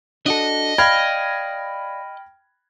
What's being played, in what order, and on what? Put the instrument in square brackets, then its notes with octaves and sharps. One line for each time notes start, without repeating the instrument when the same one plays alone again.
[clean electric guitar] D4 F#4 A4 [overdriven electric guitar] D#5
[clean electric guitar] D5 F5 [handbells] G5 F6 A#6 [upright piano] B5 G#6